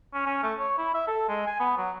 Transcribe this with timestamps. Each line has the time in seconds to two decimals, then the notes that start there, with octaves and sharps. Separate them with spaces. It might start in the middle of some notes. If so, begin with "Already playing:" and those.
0.14 C#4
0.26 C#4
0.43 A3
0.59 C#5
0.78 E4
0.94 E5
1.07 A4
1.29 G#3
1.47 G#5
1.60 B3
1.77 F#3